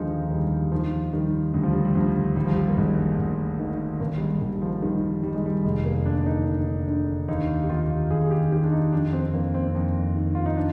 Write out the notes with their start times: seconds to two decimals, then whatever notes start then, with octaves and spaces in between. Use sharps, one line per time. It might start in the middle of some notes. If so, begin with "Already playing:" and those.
Already playing: D#2 D3 F3 G#3 D#4 G4
0.31 D#2 G3
0.72 D#3 F3
1.13 D#3 G3
1.53 D2 G3
1.63 F3
1.73 G3
1.85 G3
1.95 D2 F3
2.36 G#1 G3
2.46 F3
2.55 G3
2.68 A#3
2.77 G#1 G#3
3.18 G#1
3.60 D#3
4.00 G#1 A#3
4.16 G3
4.21 G#3
4.41 G#1 G3
4.62 F3
4.82 D#3 G3
5.23 D#3 G3
5.35 G#3
5.46 G3
5.64 F1 G#3
5.85 A#3
6.05 D3 D4
6.17 D4
6.26 D#4
6.46 D3
6.88 D3
7.28 D#2 D#4
7.63 G4
7.70 D#2 F4
8.10 D#2 G#4
8.24 G#4
8.31 G4
8.52 D#3 G4
8.64 D4
8.72 D#4
8.92 F2 D4
9.13 C4
9.33 F2 A#3
9.54 C4
9.75 F2
10.16 D#3
10.35 F4
10.46 D#4
10.57 D4